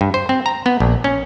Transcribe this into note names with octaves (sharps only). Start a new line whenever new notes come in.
G2
C5
C4
A#5
B3
A#1
C#4